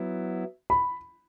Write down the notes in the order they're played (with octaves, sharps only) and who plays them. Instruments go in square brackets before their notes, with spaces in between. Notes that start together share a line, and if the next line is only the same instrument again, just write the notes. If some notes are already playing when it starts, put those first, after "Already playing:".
Already playing: [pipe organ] F#3 B3 E4
[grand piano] B5